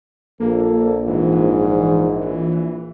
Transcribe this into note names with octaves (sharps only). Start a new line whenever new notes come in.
A#1 A#3 A4
G#2 E3